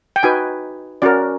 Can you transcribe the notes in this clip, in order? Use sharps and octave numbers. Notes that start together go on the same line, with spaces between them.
G5
D#4 F#4 B4 G#5
C#4 F#4 A#4 D5